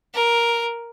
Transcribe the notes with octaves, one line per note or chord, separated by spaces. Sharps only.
A#4